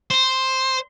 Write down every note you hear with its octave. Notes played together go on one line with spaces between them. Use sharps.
C5